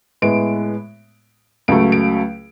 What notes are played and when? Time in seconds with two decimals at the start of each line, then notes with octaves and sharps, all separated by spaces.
0.22 A2 G#3 B3 D7
1.68 C#2 C#3 F#3 A3 D7
1.92 D7